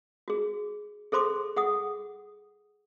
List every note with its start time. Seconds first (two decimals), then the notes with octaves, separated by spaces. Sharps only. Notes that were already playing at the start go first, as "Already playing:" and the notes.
0.28 F#4 G#4
1.12 G#4 A4 C5 C6 D6
1.56 G#4 F#5 D#6